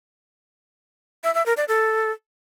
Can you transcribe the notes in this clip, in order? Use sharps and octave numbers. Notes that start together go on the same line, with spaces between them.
E5
E5
A#4
D5
A4